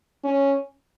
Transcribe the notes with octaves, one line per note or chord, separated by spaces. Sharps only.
C#4